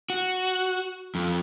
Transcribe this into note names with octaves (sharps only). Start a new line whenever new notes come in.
F#4
F2